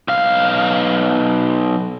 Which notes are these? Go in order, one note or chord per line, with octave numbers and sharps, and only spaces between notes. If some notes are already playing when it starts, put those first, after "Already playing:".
B1 F5